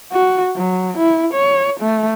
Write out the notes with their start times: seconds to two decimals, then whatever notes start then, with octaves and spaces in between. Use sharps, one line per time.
0.12 F#4
0.56 F#3
0.98 E4
1.34 C#5
1.80 A3